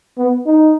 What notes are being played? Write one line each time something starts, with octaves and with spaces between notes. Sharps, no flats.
B3
D#4